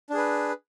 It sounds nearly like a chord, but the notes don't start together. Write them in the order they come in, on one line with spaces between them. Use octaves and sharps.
D4 G#4 B4